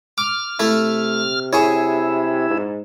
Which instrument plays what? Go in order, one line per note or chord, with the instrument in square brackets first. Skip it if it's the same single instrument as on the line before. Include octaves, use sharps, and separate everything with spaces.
[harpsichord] D6 [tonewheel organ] F6
[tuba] C3 [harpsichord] A3 E4
[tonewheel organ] E4 [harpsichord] G#4 C#5
[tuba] G#2